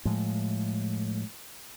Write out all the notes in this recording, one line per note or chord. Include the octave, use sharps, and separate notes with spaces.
A2 F3 G#3